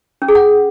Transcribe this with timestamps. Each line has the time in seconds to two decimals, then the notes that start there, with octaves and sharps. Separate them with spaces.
0.22 C#4
0.28 G#4
0.35 F#5